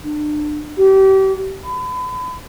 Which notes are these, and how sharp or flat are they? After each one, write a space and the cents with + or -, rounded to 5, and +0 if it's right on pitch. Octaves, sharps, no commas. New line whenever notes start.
D4 +30
G4 -30
B5 +35